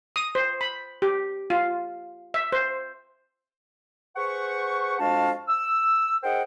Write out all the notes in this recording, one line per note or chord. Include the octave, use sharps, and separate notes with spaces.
D#6
C5
B5
G4
F4
E5
C5
G#4 B4 C5 F#5 C#6
F2 G#3 D4 F#4 F5 A5
E6
D#4 G#4 A#4 C5 F#5 G5